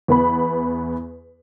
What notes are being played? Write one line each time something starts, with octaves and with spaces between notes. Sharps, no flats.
E2 B3 B5